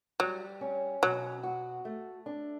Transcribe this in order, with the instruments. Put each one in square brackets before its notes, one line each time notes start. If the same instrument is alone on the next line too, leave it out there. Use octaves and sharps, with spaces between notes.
[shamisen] F#3 [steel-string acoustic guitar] G3
[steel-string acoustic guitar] C#4
[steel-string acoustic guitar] B2 [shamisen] F#3
[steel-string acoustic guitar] F#4
A3
D4